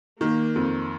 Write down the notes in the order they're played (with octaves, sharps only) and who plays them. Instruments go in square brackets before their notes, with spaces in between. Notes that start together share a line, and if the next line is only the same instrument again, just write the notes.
[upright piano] D#3 [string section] A#3
[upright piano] F2